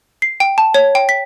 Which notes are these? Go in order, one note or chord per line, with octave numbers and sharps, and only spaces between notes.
C7
G5
A5
C#5
G5
B6